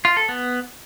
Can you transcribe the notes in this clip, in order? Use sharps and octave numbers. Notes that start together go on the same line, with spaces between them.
F4
A4
B3